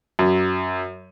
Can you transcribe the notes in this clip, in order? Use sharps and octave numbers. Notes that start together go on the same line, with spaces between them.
F#2